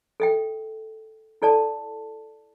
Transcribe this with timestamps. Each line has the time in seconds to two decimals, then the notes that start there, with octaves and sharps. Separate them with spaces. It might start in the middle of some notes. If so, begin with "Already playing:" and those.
0.20 A4 E5 G5
1.42 E4 A4 D5 A5